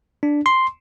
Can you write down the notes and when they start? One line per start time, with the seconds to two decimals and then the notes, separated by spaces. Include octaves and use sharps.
0.23 D4
0.46 C6